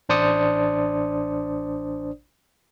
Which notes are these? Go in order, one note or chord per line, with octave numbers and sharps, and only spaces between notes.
A1 D4 C5 D5 D#6 C#7